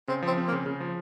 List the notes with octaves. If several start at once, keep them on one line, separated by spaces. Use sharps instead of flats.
C#3 C4
F3 C4
C4
A#3
C#3
C#3
F3